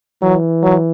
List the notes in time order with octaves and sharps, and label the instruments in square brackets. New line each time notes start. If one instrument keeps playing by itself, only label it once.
[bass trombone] E3 [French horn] F#3
[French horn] F#3